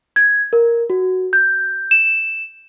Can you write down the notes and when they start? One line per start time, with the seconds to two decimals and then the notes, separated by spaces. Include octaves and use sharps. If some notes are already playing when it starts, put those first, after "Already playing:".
0.16 G#6
0.53 A#4
0.90 F#4
1.33 G6
1.91 E7